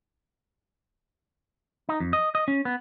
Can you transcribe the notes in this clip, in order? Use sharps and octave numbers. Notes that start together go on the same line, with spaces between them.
D#4
F2
D#5
D#5
C#4
B3